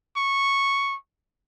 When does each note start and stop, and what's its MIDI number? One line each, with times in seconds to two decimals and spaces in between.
0.17 0.96 85